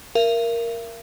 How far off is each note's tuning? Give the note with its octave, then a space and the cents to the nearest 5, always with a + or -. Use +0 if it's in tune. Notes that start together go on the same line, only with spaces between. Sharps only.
A#4 +0 E5 +45